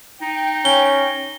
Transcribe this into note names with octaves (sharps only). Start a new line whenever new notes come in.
D#4 G5
C#4 G7